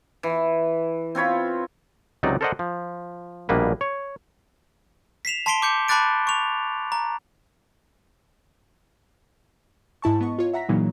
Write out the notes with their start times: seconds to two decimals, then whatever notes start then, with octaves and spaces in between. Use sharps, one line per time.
0.23 E3
1.15 C4 F4 C#5 B5
2.23 C#2 C3 F#3 D#4 D5
2.41 A4 A#4 C5 D5 D#5 F#5
2.59 F3
3.49 A#1 B2 G3 A#3 B4
3.81 C#5
5.25 B6 C7 E7 F7
5.46 A5 C6 B6 C7 D7 G7
5.62 D6 G6 C#7
5.88 A5 B5 D6 F#6 A6 D7
6.27 C#6 F7
6.92 A#5
10.02 G#2 E4 A5 C#6
10.21 B3 D#5 C#6
10.39 F4 C#5
10.53 E5 F#5 A#5 A#6 B6
10.69 A#2 C#3 E3 F#3 A#3 D#4